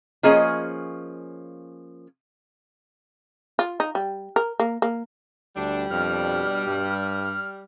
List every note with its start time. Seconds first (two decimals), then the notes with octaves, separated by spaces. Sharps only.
0.23 F3 A#3 C#4 G#4 C#5 D#5
3.59 F4
3.80 D#4
3.95 G3
4.36 A#4
4.60 A#3
4.82 A#3
5.56 D2 G3 D4
5.90 F2 B2 D4 F6
6.67 G2